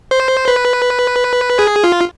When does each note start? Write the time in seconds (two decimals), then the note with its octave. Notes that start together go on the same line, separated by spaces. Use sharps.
0.11 C5
0.48 B4
1.59 G#4
1.84 F4